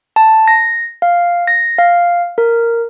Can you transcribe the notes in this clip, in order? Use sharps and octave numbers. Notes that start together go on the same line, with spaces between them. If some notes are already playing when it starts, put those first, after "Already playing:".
A5
A#6
F5
A#6
F5
A#4